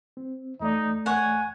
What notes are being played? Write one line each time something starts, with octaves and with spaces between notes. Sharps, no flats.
C4
E2 A3 D#4 D5
C#5 F#5 G#5